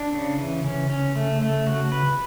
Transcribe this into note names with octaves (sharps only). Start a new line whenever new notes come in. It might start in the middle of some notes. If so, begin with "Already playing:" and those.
Already playing: D4
C#3
E3
C#3 C#4
C#4
A3
A3
F#4
B4